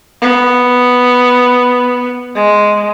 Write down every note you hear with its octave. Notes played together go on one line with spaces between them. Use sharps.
B3
G#3